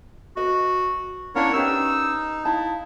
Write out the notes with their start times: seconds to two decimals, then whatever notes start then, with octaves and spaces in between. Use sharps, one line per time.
0.37 F#4 B4 D#5
1.35 C#4 D4 E4 A#4 C#5 F5 F#5
1.54 C#4 D#4 G4 B4 E6
2.45 D#4 E4 F5 A5